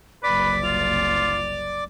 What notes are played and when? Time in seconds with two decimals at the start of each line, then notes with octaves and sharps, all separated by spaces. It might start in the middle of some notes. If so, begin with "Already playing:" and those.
0.24 F#1 C2 B4 D5 D6 B6
0.64 F4 F7